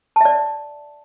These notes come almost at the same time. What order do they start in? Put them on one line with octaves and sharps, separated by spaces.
A5 E5 D5